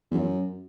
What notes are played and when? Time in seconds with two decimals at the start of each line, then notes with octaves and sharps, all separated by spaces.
0.11 E2
0.14 F#2